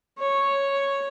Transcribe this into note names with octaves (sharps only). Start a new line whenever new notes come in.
C#5